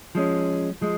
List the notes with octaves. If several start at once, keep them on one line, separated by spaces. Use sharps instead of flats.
F3 G#3 C#4
F3 G#3